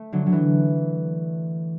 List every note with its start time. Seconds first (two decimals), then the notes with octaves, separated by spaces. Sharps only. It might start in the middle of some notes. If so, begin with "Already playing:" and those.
Already playing: A3
0.12 D3 F#3
0.26 F#3
0.32 E3